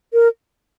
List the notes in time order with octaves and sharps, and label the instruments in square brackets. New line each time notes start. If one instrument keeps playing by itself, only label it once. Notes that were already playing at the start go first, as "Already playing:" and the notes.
[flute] A#4